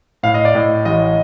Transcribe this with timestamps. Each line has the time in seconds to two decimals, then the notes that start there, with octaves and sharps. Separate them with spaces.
0.23 A2 F5
0.34 D#5
0.45 D5
0.55 A2 D#5
0.85 A1 D#5